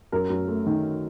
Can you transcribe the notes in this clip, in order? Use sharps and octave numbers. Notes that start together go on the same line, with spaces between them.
F#2 A#4
F#2
A3
D#3